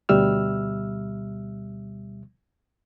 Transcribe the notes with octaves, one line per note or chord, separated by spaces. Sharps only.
D2 B2 G3 E5 E6 F6